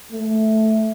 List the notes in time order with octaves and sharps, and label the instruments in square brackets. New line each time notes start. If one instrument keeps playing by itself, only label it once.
[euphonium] A3